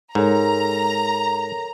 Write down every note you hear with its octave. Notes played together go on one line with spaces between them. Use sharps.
G#2 A4 A#4 C#5 A#5